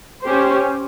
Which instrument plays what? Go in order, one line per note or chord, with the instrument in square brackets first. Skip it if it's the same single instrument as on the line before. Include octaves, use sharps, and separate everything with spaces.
[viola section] C#4 G4 C5